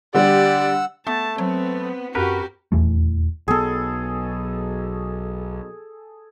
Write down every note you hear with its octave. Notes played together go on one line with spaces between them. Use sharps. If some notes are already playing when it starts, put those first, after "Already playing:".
D3 G3 G4 D5 F#5 E6
A3 B3 A5
F#3 B3 C4
F#2 F#4 G4 A#4 B4
D#1 E2 E3 A3
B1 B3 G#4 A4